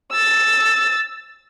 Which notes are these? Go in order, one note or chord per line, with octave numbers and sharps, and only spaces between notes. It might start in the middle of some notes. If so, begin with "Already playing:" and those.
E6 A6